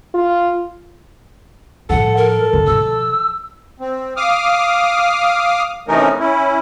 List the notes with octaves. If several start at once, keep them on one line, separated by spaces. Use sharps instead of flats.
F4
A2 F3 A4 F#5
A#4
D3 C4
B2 F3 E6
C4
F5 D6 D#6 F6
C3 E3 A3 C#4 D#4 A#4
C#4 E4